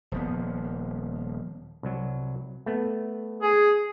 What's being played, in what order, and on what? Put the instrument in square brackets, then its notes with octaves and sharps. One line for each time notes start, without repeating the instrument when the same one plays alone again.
[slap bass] D#1 F3 B3
[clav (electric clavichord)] C2 F#3
A3 B3
[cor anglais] G#4